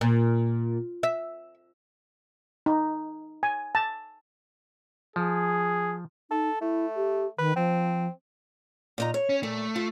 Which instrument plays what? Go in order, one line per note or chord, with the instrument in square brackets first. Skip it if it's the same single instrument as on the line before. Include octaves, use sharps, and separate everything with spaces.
[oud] A#2
E5
[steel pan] D#4
G#5
A5
[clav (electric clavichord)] F3 [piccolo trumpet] G#4
[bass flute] D#4 [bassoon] A4
[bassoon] A3 [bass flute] E4
[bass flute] G4
[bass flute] D#3 [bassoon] B4
[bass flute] F3 [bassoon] C4
[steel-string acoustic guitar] A#2 D#4 A#5
C#5
[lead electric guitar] C#4
[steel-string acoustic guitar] A#2 [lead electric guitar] A3
[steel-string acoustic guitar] F4